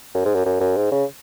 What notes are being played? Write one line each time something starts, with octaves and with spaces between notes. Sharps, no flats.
F#2
G#2
F#2
F#2
F#2
G#2
C#3